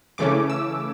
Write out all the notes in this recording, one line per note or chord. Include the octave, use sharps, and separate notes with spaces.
C#3 E3 A3 C#4 D6
E6